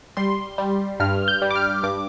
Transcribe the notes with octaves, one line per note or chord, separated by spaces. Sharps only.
G3 C6
G3
G2 F6
G6
G3
D6
F6
G2 D6